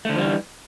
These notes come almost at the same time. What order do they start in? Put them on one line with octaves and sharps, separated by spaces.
A3 D3 F3 G3 E3